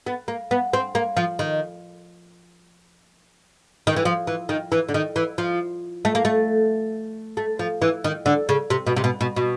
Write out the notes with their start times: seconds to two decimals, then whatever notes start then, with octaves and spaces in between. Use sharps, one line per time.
0.07 B3
0.28 A#3
0.51 B3
0.73 C4
0.95 A#3
1.17 F3
1.39 D#3
3.87 D#3
3.96 E3
4.05 F3
4.27 E3
4.49 D#3
4.72 E3
4.89 D3
4.94 D#3
5.16 E3
5.38 F3
6.05 A3
6.15 A#3
6.25 A3
7.37 A3
7.59 F3
7.82 E3
8.04 D#3
8.26 D3
8.49 C#3
8.70 C3
8.87 B2
8.96 C3
9.04 B2
9.21 B2
9.36 B2